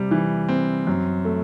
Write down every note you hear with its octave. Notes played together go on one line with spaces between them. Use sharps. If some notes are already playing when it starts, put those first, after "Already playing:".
Already playing: C3 G3
E3
C4
F#2
A3